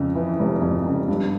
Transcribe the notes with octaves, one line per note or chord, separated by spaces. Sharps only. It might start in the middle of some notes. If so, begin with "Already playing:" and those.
Already playing: F2 C#3
E3
F1
F2
C#3
G2